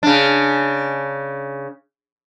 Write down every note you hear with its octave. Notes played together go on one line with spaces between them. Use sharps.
C#3 D4